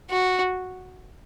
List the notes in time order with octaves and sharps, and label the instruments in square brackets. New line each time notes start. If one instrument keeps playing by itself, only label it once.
[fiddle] F#4